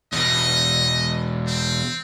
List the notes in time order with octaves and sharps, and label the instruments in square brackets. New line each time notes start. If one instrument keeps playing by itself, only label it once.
[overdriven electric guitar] E2 B2 [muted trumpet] D#5
[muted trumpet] C4